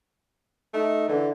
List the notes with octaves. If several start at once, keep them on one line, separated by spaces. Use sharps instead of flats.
A3 D#4
D3 E3